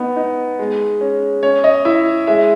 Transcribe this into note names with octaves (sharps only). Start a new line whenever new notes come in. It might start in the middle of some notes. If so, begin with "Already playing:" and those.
Already playing: B3 D#4
D#4
G#3
C#4
C#4 C#5
D#5
E4 E5
G#3 E5